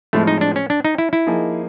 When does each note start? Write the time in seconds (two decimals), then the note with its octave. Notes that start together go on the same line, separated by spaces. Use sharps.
0.13 A2 F3 G#3 A3 C4
0.27 D#4
0.41 D4
0.56 C#4
0.70 D4
0.85 D#4
0.98 E4
1.13 E4
1.27 F3 A#3 D#4 G#4